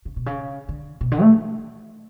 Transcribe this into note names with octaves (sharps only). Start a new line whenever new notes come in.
C#3
B2
C#3
D3
B2
D3
A3